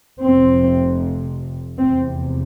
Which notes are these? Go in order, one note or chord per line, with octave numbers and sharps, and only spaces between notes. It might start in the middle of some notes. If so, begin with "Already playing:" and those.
F1 F2 C3 C4
F1 E2 C3 C4